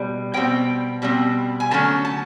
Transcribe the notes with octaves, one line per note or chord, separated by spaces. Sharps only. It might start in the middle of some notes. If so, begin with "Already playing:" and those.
Already playing: B2 G3
B2 G3 C4 G5
B2 G3 C4
G#5
D3 F#3 A3 C#4 A5
A5